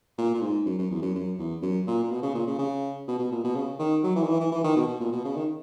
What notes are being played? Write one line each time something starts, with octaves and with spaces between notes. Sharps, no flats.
A#2
A#2
G#2
F#2
F#2
E2
F#2
F#2
E2
F#2
A#2
A#2
B2
C#3
A#2
C#3
C#3
B2
B2
A#2
B2
C#3
D#3
F#3
E3
D#3
E3
E3
E3
D#3
B2
B2
A#2
B2
C#3
D#3